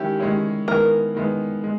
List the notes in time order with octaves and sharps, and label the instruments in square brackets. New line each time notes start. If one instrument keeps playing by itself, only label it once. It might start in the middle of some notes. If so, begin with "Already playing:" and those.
Already playing: [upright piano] D#3 G#3 C#4 E4 [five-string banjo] G4
[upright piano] D#3 G#3 C#4 E4
[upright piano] D#3 G#3 B3 E4 [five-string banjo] A#4
[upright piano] D#3 G#3 B3 E4
G#3